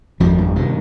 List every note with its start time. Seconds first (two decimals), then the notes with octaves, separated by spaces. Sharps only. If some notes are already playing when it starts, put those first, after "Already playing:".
0.20 G#1 F2 F3
0.38 G2
0.55 C3 D#3